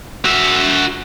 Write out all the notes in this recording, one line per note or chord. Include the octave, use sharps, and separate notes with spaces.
F#4 E5